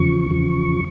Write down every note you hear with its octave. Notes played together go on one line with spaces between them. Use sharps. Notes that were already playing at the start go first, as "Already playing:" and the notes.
Already playing: E2 C#3 F3 C#6
E2 C#3 F3